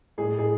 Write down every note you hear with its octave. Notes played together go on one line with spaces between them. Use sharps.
A2 G#4
G#4